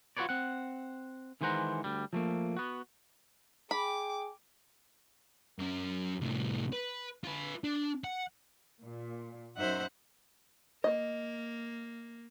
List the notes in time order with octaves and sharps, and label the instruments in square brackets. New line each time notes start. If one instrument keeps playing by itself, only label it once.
[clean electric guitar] F4 F#4 A#4 B4 C#5 D5
C4 F#5
D#3 E3 G#3 C5 F#5 A#5
D2 G3
F3 A3 A#3
B3 F#4
[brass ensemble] G#4 G5 [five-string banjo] B5 [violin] D6
[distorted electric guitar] F#2 C#4
C2 A2
B4
F4 B4
D4
F#5
[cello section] A#2
[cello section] F#2 D#4 E5 [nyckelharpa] C5 F#5
[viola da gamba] A#3 [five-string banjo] D#5